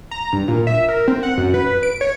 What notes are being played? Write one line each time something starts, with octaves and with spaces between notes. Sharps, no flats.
A#5
G2
A#2
E5
A#4
C4
F#5
F#2
B4
D7
C#5